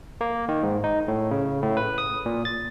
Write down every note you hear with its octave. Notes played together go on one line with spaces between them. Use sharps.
A#3
D#3
G#2
D#4
A2
C#3
A2
B4
D#6
A#2
A6